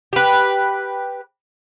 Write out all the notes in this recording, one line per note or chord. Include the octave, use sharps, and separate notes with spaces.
G4 B4